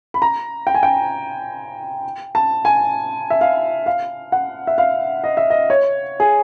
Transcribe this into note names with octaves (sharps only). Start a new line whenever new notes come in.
B5
A#5
G5
G#5
G5
A5
G#5
E5
F5
F5
F#5
E5
F5
D#5
E5
D#5
C#5
G#4